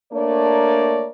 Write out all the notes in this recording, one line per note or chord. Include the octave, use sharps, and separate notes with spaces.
A3 A#3 D4 A#4 C#5 D5